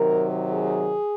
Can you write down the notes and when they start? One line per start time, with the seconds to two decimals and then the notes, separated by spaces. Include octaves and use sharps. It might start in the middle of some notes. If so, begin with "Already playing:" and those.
Already playing: C3 D#3 F#3 A#4
0.51 G#4